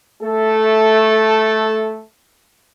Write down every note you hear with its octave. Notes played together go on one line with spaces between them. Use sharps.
A3 A4